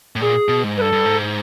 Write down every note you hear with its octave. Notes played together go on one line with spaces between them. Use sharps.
A2
A#2 G#4
B2
G#2
G2 A4 B4
G2
G#2